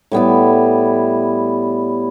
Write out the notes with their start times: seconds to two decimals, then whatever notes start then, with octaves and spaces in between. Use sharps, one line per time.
0.12 A2 G3 B3 E4